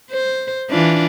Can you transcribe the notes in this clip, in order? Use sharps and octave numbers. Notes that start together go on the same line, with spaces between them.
C5
E3 D4 F4